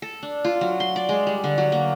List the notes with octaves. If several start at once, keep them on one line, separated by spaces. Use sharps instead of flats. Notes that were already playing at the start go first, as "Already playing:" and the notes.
A4
D4
F4
F#3
C6
D5
G#3
G3
D3
F#3
A#3